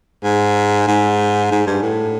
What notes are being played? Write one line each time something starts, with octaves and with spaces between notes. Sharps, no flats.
G#2
G#2
G#2
G2
A2